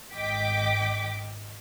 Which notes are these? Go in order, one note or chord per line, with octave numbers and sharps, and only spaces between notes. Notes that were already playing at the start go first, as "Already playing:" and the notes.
G#1 D#5 G5 D6 B6